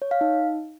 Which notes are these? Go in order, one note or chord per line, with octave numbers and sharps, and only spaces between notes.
C#5
F5
D#4